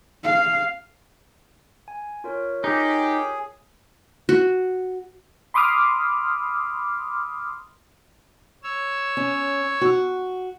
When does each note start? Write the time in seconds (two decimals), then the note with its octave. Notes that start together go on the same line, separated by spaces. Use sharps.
0.23 F5
1.88 G#5
2.24 F4 A#4 C#5
2.64 D#4 G4 G#4
4.29 F#4
5.54 B5 C6 D6 D#6 F6
8.63 C#5 E6
9.17 C#4
9.81 F#4